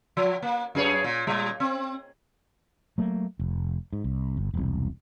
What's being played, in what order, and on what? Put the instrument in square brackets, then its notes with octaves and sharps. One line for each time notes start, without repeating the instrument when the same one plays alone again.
[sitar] F3
A#3
F#2 G#4 C#5
A#2
A#2 G3
C4
[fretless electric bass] F#3 A3 A#3
F1
G#2
C2
G1
E1 C2